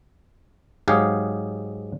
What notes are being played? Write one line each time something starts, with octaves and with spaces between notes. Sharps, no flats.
G#2 F#3 G4 G#4 F5